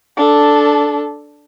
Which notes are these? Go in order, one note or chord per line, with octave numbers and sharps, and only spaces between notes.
D4 A4